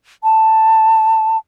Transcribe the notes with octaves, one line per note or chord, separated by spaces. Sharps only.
A5